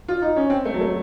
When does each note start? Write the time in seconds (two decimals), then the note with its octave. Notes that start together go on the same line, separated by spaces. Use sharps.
0.08 F4
0.22 D#4
0.37 C#4
0.50 C4
0.65 A3
0.74 F#3
0.81 A3